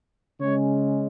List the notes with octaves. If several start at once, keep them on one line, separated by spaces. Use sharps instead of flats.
C#3 G#3 C#4 C#5